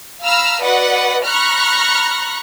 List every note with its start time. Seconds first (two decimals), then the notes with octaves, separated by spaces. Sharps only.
0.25 F5 A#5 B5 E6 F6
0.63 F#4 B4 D5 D#5 F#5
1.25 A#5 B5 C#6 F6 F#6 A#6